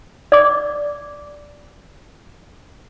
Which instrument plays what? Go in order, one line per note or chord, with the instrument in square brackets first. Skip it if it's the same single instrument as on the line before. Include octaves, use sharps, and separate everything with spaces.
[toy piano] D5 D6